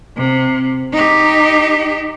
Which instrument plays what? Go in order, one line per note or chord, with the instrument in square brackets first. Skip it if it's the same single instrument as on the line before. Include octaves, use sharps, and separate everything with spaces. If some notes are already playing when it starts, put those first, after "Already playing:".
[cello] C3
D#4 G4